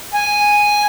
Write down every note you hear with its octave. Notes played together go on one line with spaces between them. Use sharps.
G#5